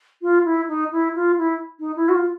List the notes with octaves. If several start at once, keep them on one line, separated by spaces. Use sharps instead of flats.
F4
E4
D#4
E4
F4
E4
D#4
E4
F#4
F4